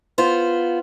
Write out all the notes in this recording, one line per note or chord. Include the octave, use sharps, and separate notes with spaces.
B3 F4 C5